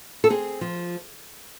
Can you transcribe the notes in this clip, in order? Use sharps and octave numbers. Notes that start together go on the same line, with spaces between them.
A4
C4 G#4
F3